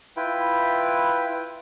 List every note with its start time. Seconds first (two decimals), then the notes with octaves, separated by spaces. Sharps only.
0.17 E4 F4 B4 G5